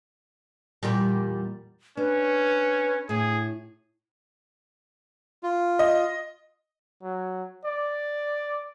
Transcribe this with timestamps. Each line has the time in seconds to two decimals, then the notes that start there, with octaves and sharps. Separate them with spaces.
0.83 E2 A#2 G3
1.97 C#4 D4 B4
3.09 A2 G#4
5.43 F4
5.79 D#5
7.03 F#3
7.65 D5